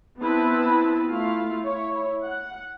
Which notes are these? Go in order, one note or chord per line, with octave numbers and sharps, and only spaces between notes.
B3 C4 E4 B4 A5
A3 E4 F4 F5
E4 C#5
F#5